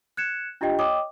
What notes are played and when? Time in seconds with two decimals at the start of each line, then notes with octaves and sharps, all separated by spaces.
0.17 F#6 G#6 C#7 E7
0.61 D4 F4 G4 D#5 G5
0.79 C#5 D#5 G5 D6 D#6